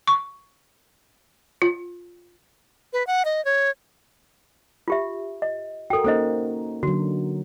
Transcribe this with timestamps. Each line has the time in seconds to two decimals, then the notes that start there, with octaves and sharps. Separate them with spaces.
0.07 C#6
1.62 F4
2.93 B4
3.07 F#5
3.25 D#5
3.45 C#5
4.88 F4 G4 E5
5.42 D#5
5.90 F#4 A4 A#4 G5
6.04 A#3 C#4 D#4 A4 C5 D#5
6.83 D3 F#3 F#4